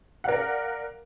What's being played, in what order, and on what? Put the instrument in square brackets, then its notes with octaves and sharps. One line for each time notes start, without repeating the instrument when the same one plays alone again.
[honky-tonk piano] A#4 D5 F5 F#5